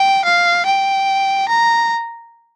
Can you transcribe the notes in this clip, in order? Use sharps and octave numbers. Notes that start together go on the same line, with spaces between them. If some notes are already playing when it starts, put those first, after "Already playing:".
Already playing: G5
F5
G5
A#5